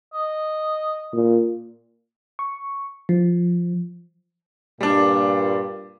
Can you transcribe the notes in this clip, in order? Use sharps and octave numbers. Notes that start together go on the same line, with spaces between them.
D#5
A#2
C#6
F3
G2 A#2 G3 D4